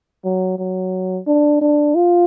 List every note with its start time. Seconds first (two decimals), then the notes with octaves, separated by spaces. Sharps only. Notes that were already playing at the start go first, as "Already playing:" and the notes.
0.25 F#3
0.59 F#3
1.27 D4
1.62 D4
1.96 F4